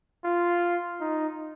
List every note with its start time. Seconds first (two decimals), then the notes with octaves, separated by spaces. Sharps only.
0.25 F4
1.01 D#4